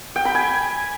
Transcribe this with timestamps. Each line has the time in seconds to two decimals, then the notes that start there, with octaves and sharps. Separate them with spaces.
0.16 G5
0.25 B5
0.35 G#5